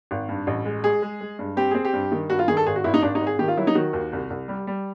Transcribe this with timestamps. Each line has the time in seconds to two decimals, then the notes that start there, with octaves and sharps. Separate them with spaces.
0.11 G#1
0.29 G2
0.47 A1
0.65 G#3
0.83 G#3 G#4
1.02 G#3
1.21 G#3
1.39 G2
1.57 C4 G4
1.71 C4 G#4
1.85 G4
1.93 G2
2.12 D#3
2.30 G2 F#4
2.39 F4
2.48 D#3 G#4
2.57 A4
2.66 G#1 G#4
2.76 F#4
2.84 G#1 E4
2.94 D#4
3.02 G#1 D4
3.15 D#4
3.21 G#1
3.27 G#4
3.39 D#3 G4
3.48 F4
3.57 F#3 E4
3.67 D#4
3.75 D#3 F#4
3.93 D#2
4.13 C2
4.30 C2
4.48 G3
4.67 G3